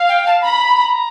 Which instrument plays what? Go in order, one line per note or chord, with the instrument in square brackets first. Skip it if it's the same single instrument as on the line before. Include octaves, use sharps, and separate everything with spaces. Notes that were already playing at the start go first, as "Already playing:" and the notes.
Already playing: [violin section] F5
[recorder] G5
A5
[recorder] A#5 [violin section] B5